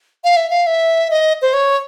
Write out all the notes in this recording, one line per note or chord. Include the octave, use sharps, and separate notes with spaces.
F5
E5
F5
E5
D#5
C5
C#5